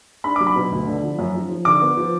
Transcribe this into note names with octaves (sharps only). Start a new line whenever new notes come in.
D4 B5
F#3 D6
B5
B2
D2
D3
F3
F#2
F3
F3
D3 D6
B3
F3